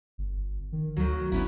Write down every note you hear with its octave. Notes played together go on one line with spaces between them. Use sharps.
G1
D#3
D2 D#3 F#3
G1 B3 C#4 E4